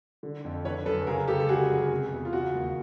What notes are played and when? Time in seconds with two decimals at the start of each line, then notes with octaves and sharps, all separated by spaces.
0.23 D3
0.45 F2
0.65 D3 B4 C#5
0.85 F#2 A4 B4
1.07 C#3 G#4 A#4
1.27 C#2 G4 A4
1.40 A4
1.49 D3 F#4 G#4
1.70 F#2
1.91 C3
2.11 E2
2.25 F4
2.33 C#3 F#4
2.55 D#2